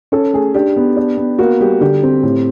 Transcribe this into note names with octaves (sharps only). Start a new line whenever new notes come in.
C#4 A4
A3 G#4
D4 G4
B3
D4
B3
A#3 F#4
G3 G4
D3 G4
C4
A2